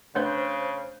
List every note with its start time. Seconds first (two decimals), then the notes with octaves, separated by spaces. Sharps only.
0.15 C#3 A3 D4 B4 C5 F#6 G6